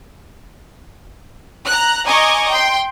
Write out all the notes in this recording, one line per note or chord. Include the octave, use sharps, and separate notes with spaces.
A#5 F#6
D#5 G#5 A#5 C#6 D6
G5 C6